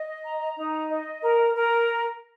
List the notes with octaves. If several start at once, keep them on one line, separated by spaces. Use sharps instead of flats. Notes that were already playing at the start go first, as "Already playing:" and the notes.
Already playing: D#5
A#5
D#4
D#5
A#4
A#4